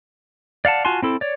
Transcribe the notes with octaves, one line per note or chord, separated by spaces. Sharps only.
D5 F5 F#5 A5
F4 F#4 G#5 A5 C6
C4 E4 A4
C#5 D5